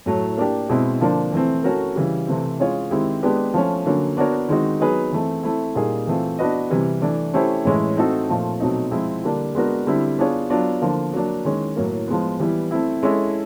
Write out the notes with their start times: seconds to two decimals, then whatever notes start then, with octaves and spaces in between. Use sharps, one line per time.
0.06 A2 F#3 A3
0.38 A#3 D4 G4
0.69 B2 G#3 C4 E4
1.00 D3 F3 A#3 D4
1.33 E3 A3 C4
1.64 A3 C#4 F#4 A#4
1.95 C#3 E3 G3
2.27 C3 E3 A3 C4
2.59 G#3 C#4 F4 G#4 C#5
2.91 D#3 G#3 C4 E4 G4
3.23 G#3 B3 D4 G4 B4
3.54 F3 A3 C#4
3.86 D3 F#3 A#3 C#4
4.17 B3 D4 F#4 A#4 C#5
4.48 D#3 G#3 C4 D#4 F#4
4.80 F#3 B3 D#4 G#4 B4
5.12 E3 A3 C4
5.43 A3 C4 E4
5.75 A#2 G3 A#3 D#4 G#4
6.07 E3 A3 C4 F4
6.39 B3 D4 F#4 B4 D#5
6.70 C3 E3 G3
7.02 E3 A3 D4
7.33 A3 C#4 E4 G4 C5
7.65 A2 E3 G#3 C#4 E4
7.97 A3 C4 D#4 F#4 A4
8.29 A#2 F3 A3
8.60 B2 F#3 A3 C4 D#4
8.91 F3 G#3 C4 E4
9.24 D3 G3 A#3 D4
9.55 G#3 B3 D4 F#4 A#4
9.87 D3 G3 C4 E4
10.18 B3 D4 F4 G#4 C#5
10.50 F#3 B3 D4 F4
10.81 D3 F3 A#3
11.14 F#3 A#3 D4
11.45 D#3 G#3 C#4
11.77 A2 F#3 A#3
12.08 F3 G#3 B3
12.40 E3 G3 B3 E4
12.71 A3 C4 E4
13.03 G#3 C#4 E4 A4